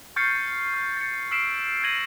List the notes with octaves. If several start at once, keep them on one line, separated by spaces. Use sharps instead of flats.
C#6 F6 G6 A6 C7 C#7
F6
A6 C#7
E6 F6 B6 C7 D7 E7
F6 G#6 A#6 D7 D#7 F#7